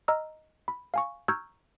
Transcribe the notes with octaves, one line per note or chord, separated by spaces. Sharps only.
D#5 A#5 E6 F6
B5
F5 G#5 C#6
A#5 C#6 E6 F6 G6 G#6